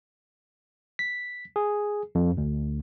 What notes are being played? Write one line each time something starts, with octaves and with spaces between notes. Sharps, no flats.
B6
G#4
F2
D2